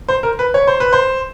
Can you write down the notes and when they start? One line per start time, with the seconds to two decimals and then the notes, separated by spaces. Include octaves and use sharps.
0.09 C5
0.23 A#4
0.39 B4
0.54 C#5
0.67 C5
0.80 B4
0.93 C5